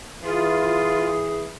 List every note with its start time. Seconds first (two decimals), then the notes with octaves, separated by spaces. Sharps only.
0.24 E3 F4 G#4